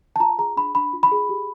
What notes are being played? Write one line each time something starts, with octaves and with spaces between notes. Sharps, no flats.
A5
F4 A#5
G#4 A#5
D4 B5
D4 B5
F4
B5
G#4
G4